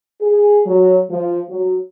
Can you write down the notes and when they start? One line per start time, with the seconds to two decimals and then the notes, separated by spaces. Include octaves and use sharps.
0.22 G#4
0.66 F#3
1.10 F3
1.49 F#3